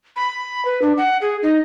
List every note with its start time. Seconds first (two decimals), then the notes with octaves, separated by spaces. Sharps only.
0.16 B5
0.65 B4
0.82 D4
0.98 F#5
1.22 G#4
1.43 D#4